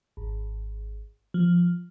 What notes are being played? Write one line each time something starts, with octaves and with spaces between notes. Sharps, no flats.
G#1
F3